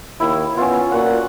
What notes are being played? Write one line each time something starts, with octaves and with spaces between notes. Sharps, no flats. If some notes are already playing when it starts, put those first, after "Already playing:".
D#2 E4
B3 C#4 F4
A#2 F#4 F#5